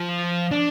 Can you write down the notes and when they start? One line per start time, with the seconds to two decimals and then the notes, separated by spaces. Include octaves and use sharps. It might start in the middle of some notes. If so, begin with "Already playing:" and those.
Already playing: F3
0.51 D4